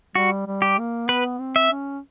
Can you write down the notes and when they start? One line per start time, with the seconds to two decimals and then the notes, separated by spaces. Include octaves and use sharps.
0.15 G3 F#4
0.47 G3
0.62 G4
0.78 A#3
1.09 B3 B4
1.40 C4
1.56 E5
1.71 C#4